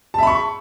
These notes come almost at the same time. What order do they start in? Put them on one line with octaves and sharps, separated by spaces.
A5 E5 B5 C#6